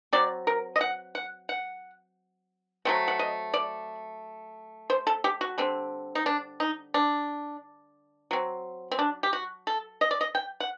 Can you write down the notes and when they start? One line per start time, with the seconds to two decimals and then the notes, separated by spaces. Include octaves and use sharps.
0.13 F#3 C4 D5
0.47 A#4
0.76 D#5
0.81 F#5
1.15 F#5
1.49 F#5
2.85 F#3 A3 C4 F#5
3.08 F#5
3.19 D#5
3.54 D5
4.90 C5
5.07 A4
5.24 G4
5.41 F#4
5.58 D3 G3 C4
6.15 D#4
6.26 D4
6.60 D#4
6.94 D4
8.31 F#3 C4
8.91 C4
8.99 D4
9.23 G4
9.33 F#4
9.67 A4
10.01 D#5
10.11 D5
10.21 D#5
10.35 G5
10.60 F#5